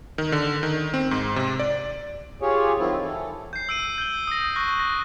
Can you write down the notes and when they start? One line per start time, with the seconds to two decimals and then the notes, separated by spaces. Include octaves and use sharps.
0.18 D#3
0.32 D3
0.63 D#3
0.94 C4
1.11 G#2
1.36 C3
1.60 D5
2.42 F4 G4 G#4 C#5
2.78 D#3 F#3 C4 E4 F4
3.01 E3 A4
3.53 G6 C7
3.69 E6 D7 D#7
3.98 G6 G7
4.27 D#6 A#6
4.56 C#6 F#6 A#6
4.79 A#6